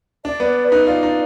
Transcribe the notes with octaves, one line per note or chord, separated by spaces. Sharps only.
D4 D5
B3
D5
B4
D#4
F4 D5
D#4